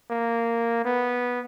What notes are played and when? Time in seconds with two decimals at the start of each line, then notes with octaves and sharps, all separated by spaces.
0.11 A#3
0.85 B3